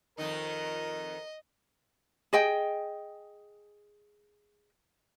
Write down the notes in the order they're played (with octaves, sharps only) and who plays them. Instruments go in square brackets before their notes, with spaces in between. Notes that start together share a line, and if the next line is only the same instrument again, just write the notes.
[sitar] F2 D#3 D#4 [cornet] A#4 [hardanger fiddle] D#5
[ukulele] G#4 D#5 G5